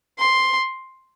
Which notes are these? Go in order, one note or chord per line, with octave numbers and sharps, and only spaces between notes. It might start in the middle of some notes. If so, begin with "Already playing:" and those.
C6